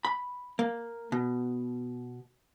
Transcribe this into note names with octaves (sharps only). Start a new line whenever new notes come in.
B5
A#3
B2